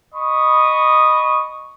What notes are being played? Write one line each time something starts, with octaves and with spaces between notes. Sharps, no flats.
D#5 B5 C#6 D#6